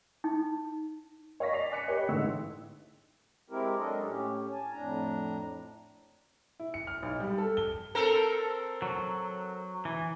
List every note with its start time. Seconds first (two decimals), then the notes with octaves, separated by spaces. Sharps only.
0.24 D#4
1.40 C#5 F5 C#6 A#6 B6
1.53 D5 C7 F7
1.71 G#5 D6 F#6 B6 C#7
1.88 G4 B4 C#5 G5
2.08 A1 G#2 D3 E3 G#3 E6
3.50 G#3 C4 E4 G4 A#4
3.77 F#3 G#3 D4 A4 A#4 D#5
4.01 A2 C#4 G4
4.52 G#5 A5
4.73 F2 A2 D4 A#5
6.60 E4
6.74 C#7
6.87 F6
7.03 B1
7.20 G3
7.38 A4
7.57 G7
7.95 C4 A4 A#4
8.82 F#3
9.85 E3